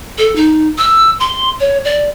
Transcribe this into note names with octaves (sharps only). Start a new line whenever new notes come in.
A4
D#4
E6
C6
C#5
D5